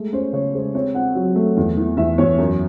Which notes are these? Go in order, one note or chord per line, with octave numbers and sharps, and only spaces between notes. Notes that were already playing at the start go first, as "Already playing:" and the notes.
Already playing: G#3 A3
C#4 C5
C#3 C#5
G#3 C5
C4 C#5
C4 F#5
F#3
A3
E2
E3
E2 E5
E2 C#5
F#2